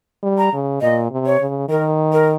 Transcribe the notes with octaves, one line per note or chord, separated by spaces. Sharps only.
G3
A#5
C#3
A#2 D#5
C3
C#5
C#3
D#3 A#4
A#4